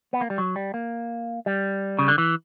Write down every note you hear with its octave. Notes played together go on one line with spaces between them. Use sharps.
B3
A#3
G3
F#3
G3
A#3
G3
C#3
D3
E3